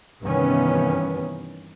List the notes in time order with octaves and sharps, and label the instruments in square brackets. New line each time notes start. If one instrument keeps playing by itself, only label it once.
[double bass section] G2 C3 D#3 E3 B3 C#4